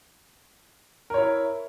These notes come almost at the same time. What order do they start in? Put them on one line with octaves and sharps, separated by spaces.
A#4 C#5 E4